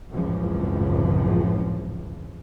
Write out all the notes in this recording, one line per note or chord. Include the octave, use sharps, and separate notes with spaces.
G#1 C#2 F#2 A2 E3 F3